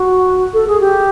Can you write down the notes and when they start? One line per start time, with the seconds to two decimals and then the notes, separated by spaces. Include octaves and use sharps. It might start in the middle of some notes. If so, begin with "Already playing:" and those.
Already playing: F#4
0.54 A4
0.68 G#4
0.81 G4